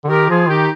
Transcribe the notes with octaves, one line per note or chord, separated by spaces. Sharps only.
D3
D#3 G4 A#4
F3 F4 G#4
D#3 D#4 G4